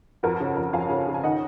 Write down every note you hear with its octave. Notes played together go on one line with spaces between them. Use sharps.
F2 F#4 A#4
C#3
F2
F2 F5 G#5
C#3
C#3
G#5
D#3 D#5 F#5